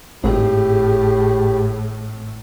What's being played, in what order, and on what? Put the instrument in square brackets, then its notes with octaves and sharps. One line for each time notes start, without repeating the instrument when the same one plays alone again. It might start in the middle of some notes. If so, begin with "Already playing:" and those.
[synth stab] G#1 [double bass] A2 [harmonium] G4 [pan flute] G#4